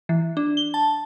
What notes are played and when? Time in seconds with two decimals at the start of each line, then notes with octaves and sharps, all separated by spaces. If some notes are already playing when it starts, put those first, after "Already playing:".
0.09 E3
0.37 D4
0.57 G7
0.74 A5